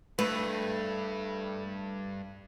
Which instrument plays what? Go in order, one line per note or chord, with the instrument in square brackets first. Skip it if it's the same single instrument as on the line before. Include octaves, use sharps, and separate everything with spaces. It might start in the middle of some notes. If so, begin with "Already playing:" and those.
[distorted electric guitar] G2 [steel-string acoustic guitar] A3 [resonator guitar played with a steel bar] B4